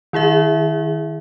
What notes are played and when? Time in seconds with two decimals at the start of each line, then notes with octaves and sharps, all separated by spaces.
0.13 D#3 E4 G#4 E5